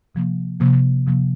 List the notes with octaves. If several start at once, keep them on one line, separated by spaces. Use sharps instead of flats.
C3 F3 A#3
C3 F3 A#3
C3 F3 A#3